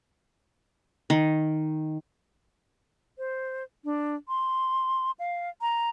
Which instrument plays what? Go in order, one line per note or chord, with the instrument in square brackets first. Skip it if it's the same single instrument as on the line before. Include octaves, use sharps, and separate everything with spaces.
[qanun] D#3
[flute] C5
D4
C6
F5
A#5